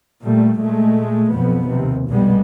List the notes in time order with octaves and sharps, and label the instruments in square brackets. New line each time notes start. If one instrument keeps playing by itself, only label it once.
[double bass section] A#2 G3 A3
A#2 G#3 A3
B1 F2 B2 F3 B3
D#2 C3
F1 B1 A#2 G3 G#3 B3